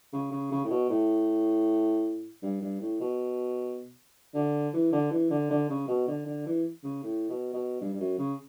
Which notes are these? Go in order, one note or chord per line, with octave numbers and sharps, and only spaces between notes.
C#3
C#3
C#3
A2
B2
A2
G2
G2
A2
B2
D3
E3
D3
E3
D3
D3
C#3
B2
D3
D3
E3
C#3
A2
B2
B2
G2
G2
F#2
C#3